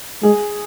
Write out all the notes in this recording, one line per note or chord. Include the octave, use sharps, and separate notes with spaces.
G#3 G#4